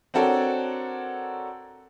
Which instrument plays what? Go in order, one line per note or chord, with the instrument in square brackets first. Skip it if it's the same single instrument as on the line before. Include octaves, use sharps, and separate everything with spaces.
[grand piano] C4 D4 F#4 A4 A#4 C#5